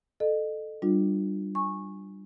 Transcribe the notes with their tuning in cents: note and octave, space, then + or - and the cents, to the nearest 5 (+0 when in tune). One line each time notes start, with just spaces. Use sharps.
A4 -5 D#5 -30
G3 -15 D4 +25 F4 +15
G#5 +0 C#6 -15